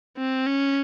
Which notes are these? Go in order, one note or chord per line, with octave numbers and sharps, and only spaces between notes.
C4
C#4